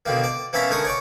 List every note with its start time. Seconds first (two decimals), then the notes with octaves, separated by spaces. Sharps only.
0.06 B2 D3 D#3 A#3
0.24 D5
0.53 A#3 B3 C#4 E5 A5 A#5
0.70 D3 D#4 A#4 G#5 C#6 D#6
0.84 C#5 D5 C#6